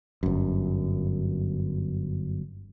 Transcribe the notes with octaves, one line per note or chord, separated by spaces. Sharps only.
G1 F#2